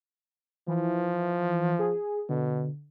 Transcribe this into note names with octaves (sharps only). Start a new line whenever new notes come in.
E3 F3
G#4
B2 D3